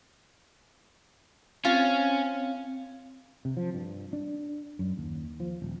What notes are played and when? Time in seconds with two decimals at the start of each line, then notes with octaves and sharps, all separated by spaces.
1.65 C4 C#4 F4
3.45 C3
3.57 F3
3.74 G2
4.13 D4
4.79 F#2
4.98 D#2
5.40 F3
5.62 D#1